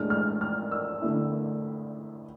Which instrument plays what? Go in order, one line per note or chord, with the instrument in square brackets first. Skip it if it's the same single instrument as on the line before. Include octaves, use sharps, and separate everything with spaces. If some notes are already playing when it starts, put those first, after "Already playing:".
Already playing: [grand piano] A2 G#3 D4 [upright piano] F6
[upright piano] F6
F6
E6
[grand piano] D3 A3 E4